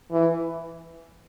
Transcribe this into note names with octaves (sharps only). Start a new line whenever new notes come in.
E3